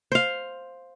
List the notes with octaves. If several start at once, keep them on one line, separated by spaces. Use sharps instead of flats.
C5 F5